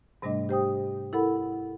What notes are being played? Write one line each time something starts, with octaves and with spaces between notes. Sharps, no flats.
G#2 C3 G3 A3 D4 D#5
G4 C5 G5 D#6
E4 A4 A#4 F#5 B5